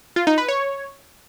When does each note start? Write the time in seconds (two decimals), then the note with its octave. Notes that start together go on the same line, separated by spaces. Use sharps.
0.16 F4
0.27 D#4
0.38 B4
0.48 C#5